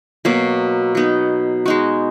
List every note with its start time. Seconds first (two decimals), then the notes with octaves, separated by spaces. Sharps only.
0.25 B2 F#3 A#3
0.95 F#3 B3 D#4
1.66 G#3 D#4 F#4